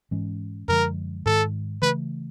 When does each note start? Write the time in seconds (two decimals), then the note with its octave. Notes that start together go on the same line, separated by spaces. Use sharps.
0.11 G#2 E3 G#3 C#4
0.68 F#2 D3 F3 G#3 A#4
1.26 G#2 D#3 G#3 A4
1.82 C#3 E3 A3 B4